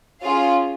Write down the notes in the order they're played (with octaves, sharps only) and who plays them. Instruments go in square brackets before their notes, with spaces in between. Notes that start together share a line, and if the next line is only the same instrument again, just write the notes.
[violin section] C#4 F4 G#4 F5